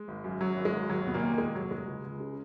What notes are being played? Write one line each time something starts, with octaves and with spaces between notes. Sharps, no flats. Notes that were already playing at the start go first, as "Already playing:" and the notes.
Already playing: G#3
G#1
F#2
F#2 F#3
G#1
G#3
G#1
D#2 F#3
F1 B3
A#2 A#3
D#3
A#3
D#2 G#3
F1 F#3
F1 G#3
C#2
C#2
C#3